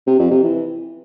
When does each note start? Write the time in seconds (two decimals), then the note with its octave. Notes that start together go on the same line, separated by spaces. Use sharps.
0.07 C3
0.19 F2
0.31 C3
0.43 E3